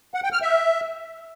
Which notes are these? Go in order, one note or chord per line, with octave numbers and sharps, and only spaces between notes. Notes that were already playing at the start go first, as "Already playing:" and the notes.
F#5
G5
F6
E5